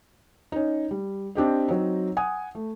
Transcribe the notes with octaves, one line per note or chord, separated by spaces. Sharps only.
C#4 D#4
G3
C4 D4 G4 D#5
F#3 C4 D#4
F#5 G#5 D#6
A3